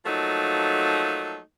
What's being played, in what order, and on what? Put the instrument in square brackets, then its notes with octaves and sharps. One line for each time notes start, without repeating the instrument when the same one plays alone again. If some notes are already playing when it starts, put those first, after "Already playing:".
[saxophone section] F3 F#3 A3 A#3 D#4